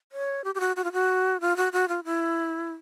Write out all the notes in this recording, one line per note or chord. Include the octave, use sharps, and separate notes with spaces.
C#5
G4
G4
F#4
F#4
F4
F#4
F4
F#4
F#4
F4
E4